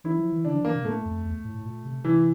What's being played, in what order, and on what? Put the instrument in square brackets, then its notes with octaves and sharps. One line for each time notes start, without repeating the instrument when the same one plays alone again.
[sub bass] E3 [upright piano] E4
[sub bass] F3
E3
[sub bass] D3 [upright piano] D4
[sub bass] F3
[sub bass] E3 [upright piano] A#3
[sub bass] C3
[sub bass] A2 [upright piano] A3
[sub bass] F2
E2
A2
A2
A#2
C3
[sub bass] C3 [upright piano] E3